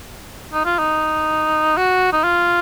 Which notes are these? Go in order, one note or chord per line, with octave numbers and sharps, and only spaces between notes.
D#4
F4
D#4
F#4
D#4
F4